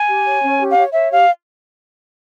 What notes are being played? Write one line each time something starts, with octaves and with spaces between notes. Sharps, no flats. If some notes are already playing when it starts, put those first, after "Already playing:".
Already playing: G#5
G4
C#5
C#4
G4
F5
C#5
C#5 E5
G4 F5